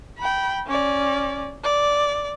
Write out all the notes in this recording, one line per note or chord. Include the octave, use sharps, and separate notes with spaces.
G5 B5
C#4 D5
D5